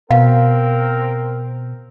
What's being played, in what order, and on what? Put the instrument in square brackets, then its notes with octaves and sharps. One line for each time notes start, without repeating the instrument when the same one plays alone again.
[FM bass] B2 [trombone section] C4 A#4 [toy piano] F5